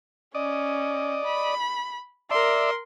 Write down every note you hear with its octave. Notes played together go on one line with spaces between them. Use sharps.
C#4 D5 D#5
B5
A#4 D5 E5 C6